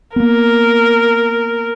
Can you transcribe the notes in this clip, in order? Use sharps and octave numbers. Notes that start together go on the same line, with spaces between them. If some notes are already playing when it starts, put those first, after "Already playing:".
A#3 B3 A#4